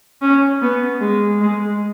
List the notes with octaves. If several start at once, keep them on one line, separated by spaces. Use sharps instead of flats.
C#4
B3
G#3
G#3